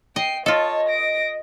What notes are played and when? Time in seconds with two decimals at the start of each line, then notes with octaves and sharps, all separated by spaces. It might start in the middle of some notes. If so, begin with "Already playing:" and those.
0.16 D#5 G5 C7
0.46 F4 A4 C#5 D#5 A5
0.88 A#6 D7